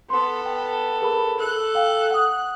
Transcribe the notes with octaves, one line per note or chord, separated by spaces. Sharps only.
B3 A4 C6
G5
G#4 A#4 B5
A4 F#6
F5 G5
F#5 D#6